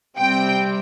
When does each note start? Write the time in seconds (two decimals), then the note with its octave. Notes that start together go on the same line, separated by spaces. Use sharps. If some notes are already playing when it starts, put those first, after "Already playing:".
0.17 C3 G3 C4 G5